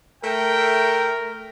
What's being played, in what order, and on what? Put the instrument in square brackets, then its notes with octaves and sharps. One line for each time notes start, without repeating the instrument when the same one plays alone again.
[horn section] A3 G5 [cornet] A#4